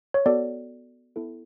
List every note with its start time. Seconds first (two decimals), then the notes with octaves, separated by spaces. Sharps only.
0.14 C#5
0.26 B3 F#4 A4 D5
1.16 B3 E4 A4